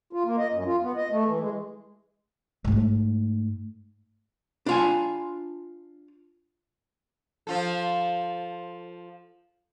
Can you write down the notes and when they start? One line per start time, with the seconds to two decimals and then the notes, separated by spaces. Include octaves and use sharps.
0.13 F4
0.25 A#3
0.38 D#5
0.53 F#2
0.66 F4
0.83 B3
0.96 D#5
1.11 A3
1.26 E3
1.39 G#3
2.65 G#2 A3
4.66 D4 F4 G#5
7.47 F3 F4 A4